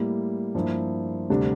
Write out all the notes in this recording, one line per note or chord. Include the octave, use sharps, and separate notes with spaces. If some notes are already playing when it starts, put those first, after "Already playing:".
Already playing: A2 G3 A#3 E4
G2 F3 A#3 E4
D2 C3 G3 D4